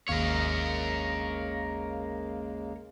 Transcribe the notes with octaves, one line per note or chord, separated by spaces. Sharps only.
G#1 D#2 C#3 G#3 A#3 A#4 C#5 F5